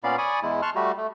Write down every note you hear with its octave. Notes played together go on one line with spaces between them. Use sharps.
A#2 B3 C#4 D5 F5 B5
D5 G#5 B5 C#6 D#6
E2 G#3 E4
A5 C6 C#6 F6 F#6
G3 A3 F#4 G4
A3